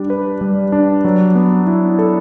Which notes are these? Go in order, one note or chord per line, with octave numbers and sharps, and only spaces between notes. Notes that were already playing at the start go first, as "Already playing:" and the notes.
Already playing: G3 D4 G4
B4
G3
D4
F#3
B3
E4
A4